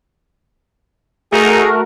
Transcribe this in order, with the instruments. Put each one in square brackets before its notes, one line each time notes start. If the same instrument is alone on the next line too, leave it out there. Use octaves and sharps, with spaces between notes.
[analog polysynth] A3 F#4 A#4 [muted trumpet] D#4 [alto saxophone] G#4